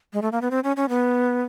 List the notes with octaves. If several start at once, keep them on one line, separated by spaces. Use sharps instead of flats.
G#3
A3
A#3
B3
C4
C#4
C#4
B3